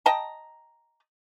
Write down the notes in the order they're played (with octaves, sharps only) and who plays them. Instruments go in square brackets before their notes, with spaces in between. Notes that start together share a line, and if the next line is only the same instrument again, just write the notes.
[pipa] D#5 G5 A5 A#5